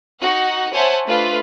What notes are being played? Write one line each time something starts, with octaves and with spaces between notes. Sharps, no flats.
D#4 F#4 F#5
C5 C#5 E5 F#5 G#5 A5
A3 D4 F4 B4 F5